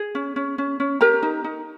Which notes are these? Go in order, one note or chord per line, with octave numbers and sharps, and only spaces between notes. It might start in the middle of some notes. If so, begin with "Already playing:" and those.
Already playing: G#4
C#4
C#4
C#4
C#4
G4 A#4 A#5
D#4
D#4